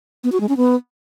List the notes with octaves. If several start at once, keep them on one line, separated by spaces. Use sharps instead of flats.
B3
F#4
G#3
C#4
B3